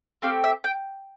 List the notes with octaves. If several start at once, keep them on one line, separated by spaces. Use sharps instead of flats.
A3 C4 G4 F5
E5
G5